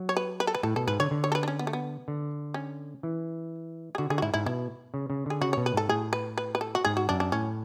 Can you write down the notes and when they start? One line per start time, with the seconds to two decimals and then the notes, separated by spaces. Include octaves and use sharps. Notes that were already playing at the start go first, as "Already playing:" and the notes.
Already playing: F#3
0.09 C#5
0.17 B4
0.40 B4
0.47 A4
0.55 B4
0.63 A2 A4
0.76 B2 A4
0.87 G#2 B4
1.00 D3 C#5
1.11 D3
1.24 C#5
1.32 A4
1.35 B4
1.43 D4
1.48 C#4
1.59 B3
1.67 A3
1.73 B3
2.08 D3
2.54 C#4
3.03 E3
3.95 G#4
3.98 D3 F#4
4.10 D3 G#4
4.18 F#4
4.22 G#2 E4
4.34 G#2 E4
4.46 B2 E4
4.94 C#3
5.10 C#3
5.26 D3 G#4
5.41 C#3 F#4
5.53 C#5
5.57 B2
5.66 B4
5.74 G#2 A4
5.89 A2 G#4
6.13 B4
6.38 B4
6.55 B4
6.61 A4
6.75 F#4
6.85 G#2 G#4
6.97 F#4
7.09 F#2 D4
7.20 D4
7.32 A2 C#4